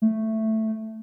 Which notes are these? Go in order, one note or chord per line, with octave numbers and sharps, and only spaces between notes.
A3